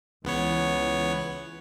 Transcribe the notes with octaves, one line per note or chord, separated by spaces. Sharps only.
C#2 E3 B3 C#5